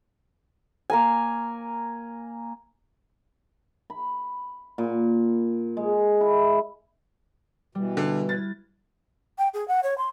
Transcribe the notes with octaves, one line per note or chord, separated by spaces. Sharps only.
A#3 A#4 G#5
B5
A#2
G#3
E4
B2 E3 G3
D3 E4
B5 F#6 G#6 A6
G5
G#4
F#5
C#5
C6